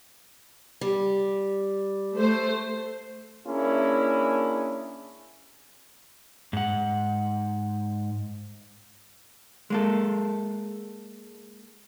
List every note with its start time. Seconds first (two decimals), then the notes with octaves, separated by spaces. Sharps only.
0.81 G3
2.17 A3 C5
3.46 A#3 C#4 D4 E4 G#4
6.53 G#2 F#5
9.70 G#3 A#3 A4